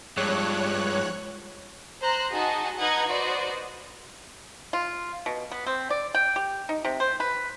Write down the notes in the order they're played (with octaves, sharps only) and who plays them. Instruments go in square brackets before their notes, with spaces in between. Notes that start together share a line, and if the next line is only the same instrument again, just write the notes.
[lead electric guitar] G2 [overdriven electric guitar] F3 G#3 [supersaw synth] C#5 F#6
[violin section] C5 A#5 C6 F#6
D#4 F#4 G#4 D#5 A5
D#4 B4 D#5 F#5 G#6
F#4 B4 C5 D5 D#5
[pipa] F4
B2
B3
C4
D5
G5
G4
D#4
C3
C5
B4